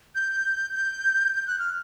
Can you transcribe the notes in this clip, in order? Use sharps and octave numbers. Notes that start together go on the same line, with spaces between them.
G6
G6
G6
F#6
F6